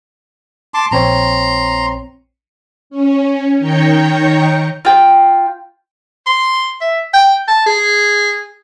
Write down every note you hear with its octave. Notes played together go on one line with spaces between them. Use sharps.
A5 C6 D6
A#1 C4 C#5 A#5 C6
C#4
D#3 C#5 G5 A#5 G6 C#7
F4 G5
C6
E5
G5
A5
G#4